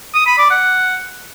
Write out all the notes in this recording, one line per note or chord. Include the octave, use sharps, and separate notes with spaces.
D#6
B5
D5
F#5